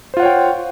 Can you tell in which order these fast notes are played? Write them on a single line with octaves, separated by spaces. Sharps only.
C5 F4 F#5 C#5 G5